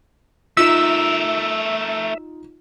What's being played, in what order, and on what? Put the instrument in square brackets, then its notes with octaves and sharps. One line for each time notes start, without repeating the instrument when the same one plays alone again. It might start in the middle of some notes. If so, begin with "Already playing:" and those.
[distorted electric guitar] A3 A#4 [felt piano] D#4 F4 [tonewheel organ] E5 [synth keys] E6